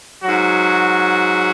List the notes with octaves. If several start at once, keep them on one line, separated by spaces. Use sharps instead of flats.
G#2 F#3 F#4